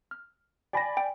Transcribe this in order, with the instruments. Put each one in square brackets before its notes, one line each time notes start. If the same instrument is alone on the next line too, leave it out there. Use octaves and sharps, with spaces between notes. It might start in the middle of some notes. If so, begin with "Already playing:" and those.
[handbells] F6
[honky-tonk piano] D5 G#5 B5 [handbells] G5 A#6
[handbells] G5